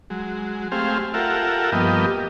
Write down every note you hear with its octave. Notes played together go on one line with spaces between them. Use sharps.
F#3 G#3
A3 C4 G4 G#4 C5 F5
F4 G4 A4 A#4 E5 F#5
G2 F3 A#3 B3 G4 D#5